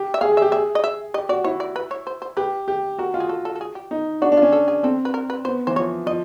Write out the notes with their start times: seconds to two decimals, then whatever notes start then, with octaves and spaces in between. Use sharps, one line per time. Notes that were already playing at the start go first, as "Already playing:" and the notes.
Already playing: G4
0.14 E5
0.21 G#4 F5
0.32 G#4
0.37 E5
0.42 G4
0.52 G#4 E5
0.75 D#5
0.84 E5
1.14 G4 D#5
1.29 F#4 D5
1.44 E4 C#5
1.60 D5
1.76 B4
1.91 C#5
2.07 C5
2.22 C5
2.37 G4 B4
2.68 G4
2.99 F#4 A#4
3.14 F4
3.20 G#4
3.29 A4
3.45 A4
3.56 A4
3.61 G#4
3.75 G4
3.91 D#4
4.22 D4 F#4
4.32 D4
4.37 F4
4.42 C#4
4.52 A4
4.68 G#4
4.83 C4 A4
5.05 B4
5.14 A#4
5.30 B4
5.45 B3 C5
5.67 E3 C5
5.76 F3 C#5
6.06 F3 D#5